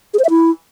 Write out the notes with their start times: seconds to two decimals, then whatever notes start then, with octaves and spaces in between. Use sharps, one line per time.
0.14 G#4
0.19 C5
0.24 E5
0.30 E4